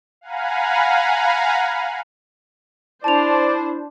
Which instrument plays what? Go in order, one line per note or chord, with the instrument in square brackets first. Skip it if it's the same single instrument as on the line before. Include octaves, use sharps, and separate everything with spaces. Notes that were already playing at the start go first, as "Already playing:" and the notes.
[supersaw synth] F5 F#5 G#5 A#5 B5
[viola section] D4 C5 [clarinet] E4 [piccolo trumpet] D5 [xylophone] A5 F7